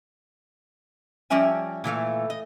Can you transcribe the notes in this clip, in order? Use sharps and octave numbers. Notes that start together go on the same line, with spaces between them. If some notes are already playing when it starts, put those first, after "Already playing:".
F3 G3 C#4 D5 E5 G#5
A#2 E3 A3 F5
D#5